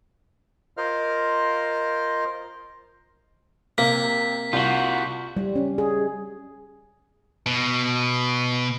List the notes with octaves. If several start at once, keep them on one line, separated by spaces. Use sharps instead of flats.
F4 A#4 C5 D#5 F5 F6
C3 A#3 B6
C2 F4 F#4
G3
C#4
G#4
B2